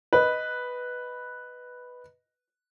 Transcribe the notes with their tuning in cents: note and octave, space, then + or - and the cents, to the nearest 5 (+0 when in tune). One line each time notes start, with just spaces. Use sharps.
B4 +0 D#5 +0